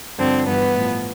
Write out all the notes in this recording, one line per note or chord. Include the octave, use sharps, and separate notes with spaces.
G2 D3 F3 C4
G2 E3 B3
A2 F3